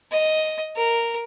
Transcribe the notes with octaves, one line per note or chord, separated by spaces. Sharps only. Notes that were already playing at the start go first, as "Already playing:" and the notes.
D#5
A#4